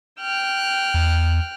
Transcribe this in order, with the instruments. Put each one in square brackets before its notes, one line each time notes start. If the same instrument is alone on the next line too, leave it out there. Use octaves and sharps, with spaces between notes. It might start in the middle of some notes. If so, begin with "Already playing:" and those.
[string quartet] G5 F6 F#6
[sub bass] E2